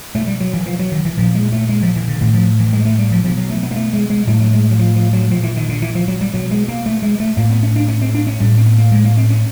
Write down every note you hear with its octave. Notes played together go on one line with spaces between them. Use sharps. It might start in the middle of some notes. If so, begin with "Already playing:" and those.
B2 A3
G3
F#3
E3
F3
F#3
D#3
E3
A#2 F3
G#3
A3
G#3
F3
E3
D3
A2 D#3
F3
E3
G#3
A3
G3
F3
B2 F3
F#3
A3
B3
A#3
A3
G#3
G#3
A2 G3
F#3
G#3
F#3
F3
F3
F#3
A#2 F3
E3
D#3
D3
E3
F3
F#3
G3
B2 F#3
G#3
A#3
A3
G#3
A3
A2 A#3
B3
C#4
D4
C#4
C4
D4
C#4
A2 G3
C4
B3
A#3
G#3
A#3
C4
C#4